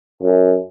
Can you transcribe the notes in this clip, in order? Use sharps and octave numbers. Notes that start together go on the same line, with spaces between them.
F#2